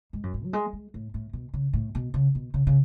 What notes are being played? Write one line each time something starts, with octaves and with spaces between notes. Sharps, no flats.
G#2
F#2
G#2
F#3
G#3
G#3
A2
A2
B2
C#3
A2
B2
C#3
B2
C#3
C#3